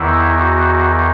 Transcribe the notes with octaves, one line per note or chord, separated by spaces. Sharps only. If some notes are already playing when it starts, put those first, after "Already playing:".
Already playing: E2 D#3 E4
F#4